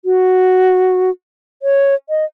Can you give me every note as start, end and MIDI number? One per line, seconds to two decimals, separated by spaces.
0.05 1.10 66
1.63 1.95 73
2.09 2.25 75